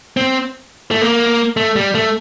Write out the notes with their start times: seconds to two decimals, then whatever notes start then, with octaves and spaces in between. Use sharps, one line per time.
0.17 C4
0.91 A3
1.01 A#3
1.57 A3
1.76 G3
1.95 A3